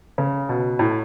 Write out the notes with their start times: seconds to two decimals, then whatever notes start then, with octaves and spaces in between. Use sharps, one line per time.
0.18 C#3
0.49 B2
0.79 A2